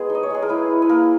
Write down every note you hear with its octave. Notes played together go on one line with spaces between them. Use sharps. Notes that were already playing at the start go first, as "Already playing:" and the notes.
Already playing: G#3 B3 G#4
D#4
D#5
C#5
G#3 G#4
A#4
E4 B4
E4
B4
A#3 A#4